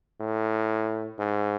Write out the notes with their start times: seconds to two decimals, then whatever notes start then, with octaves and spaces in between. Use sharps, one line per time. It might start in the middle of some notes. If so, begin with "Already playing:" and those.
0.20 A2
1.19 G#2